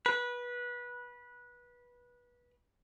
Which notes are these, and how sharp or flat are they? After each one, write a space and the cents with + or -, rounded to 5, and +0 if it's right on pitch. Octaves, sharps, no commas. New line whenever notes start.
B4 -20